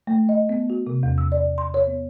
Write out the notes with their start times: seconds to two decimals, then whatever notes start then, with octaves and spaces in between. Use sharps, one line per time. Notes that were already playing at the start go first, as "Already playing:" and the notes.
0.07 A3
0.29 D#5
0.49 B3
0.70 F#4
0.87 C3
1.03 E2
1.18 E6
1.32 D5
1.58 C6
1.74 C#5
1.87 B3